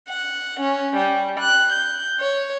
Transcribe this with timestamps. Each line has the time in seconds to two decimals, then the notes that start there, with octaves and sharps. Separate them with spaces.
0.10 F#5
0.61 C#4
0.96 G3
1.40 F#6
1.73 G6
2.20 C#5